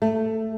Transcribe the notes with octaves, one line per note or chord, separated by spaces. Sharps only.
A3